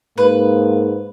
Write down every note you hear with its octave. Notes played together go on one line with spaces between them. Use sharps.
G#2 A#3 B4